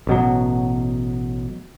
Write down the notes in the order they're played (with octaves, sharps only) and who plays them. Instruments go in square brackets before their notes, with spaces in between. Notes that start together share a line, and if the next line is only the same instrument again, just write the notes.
[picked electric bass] A1 B2 F#3